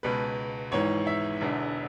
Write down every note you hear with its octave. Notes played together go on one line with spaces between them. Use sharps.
C#2 B2 B4
G#1 G#2 E3 C#5
E5
E1 E2 D3